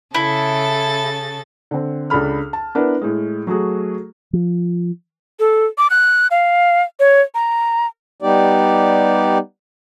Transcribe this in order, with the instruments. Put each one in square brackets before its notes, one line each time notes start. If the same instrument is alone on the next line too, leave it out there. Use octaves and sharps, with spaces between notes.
[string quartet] C#3 A4 A6 [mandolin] E4
[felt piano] D3 C4
C#2 D4 A4 B5 F6
A5
B3 D4 E4 A#4 B4 F#5
A2 G#3
F#3 A3 F#4 G#4
[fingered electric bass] F3
[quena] A4
D6
F#6
F5
C#5
A#5
[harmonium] G3 B3 D#4 G4 D5